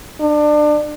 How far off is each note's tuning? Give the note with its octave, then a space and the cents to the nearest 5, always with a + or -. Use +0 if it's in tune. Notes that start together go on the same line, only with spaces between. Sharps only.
D4 +25